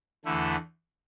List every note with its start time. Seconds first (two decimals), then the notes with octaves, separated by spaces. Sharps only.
0.25 E2 D3 A3 E4